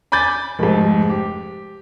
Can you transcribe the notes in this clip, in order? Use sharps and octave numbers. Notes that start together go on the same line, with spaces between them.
G#5 B5 D6 G6 A6
F1 G#2
G4